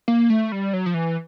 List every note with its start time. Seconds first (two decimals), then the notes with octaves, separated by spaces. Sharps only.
0.08 A#3
0.30 A3
0.52 G3
0.73 F#3
0.86 F3
0.94 E3